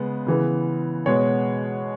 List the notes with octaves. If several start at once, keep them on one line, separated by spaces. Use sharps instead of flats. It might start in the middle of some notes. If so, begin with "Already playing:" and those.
Already playing: C#3 G#3 B3
C#3 E3 B3
B2 G#3 B3 C#5